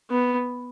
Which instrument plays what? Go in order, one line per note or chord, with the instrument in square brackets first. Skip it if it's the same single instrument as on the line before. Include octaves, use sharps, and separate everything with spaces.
[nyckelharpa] B3